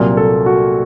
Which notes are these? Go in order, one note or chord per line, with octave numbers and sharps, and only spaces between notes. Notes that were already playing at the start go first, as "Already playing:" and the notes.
Already playing: C2 A#2 F#3
A4
F#4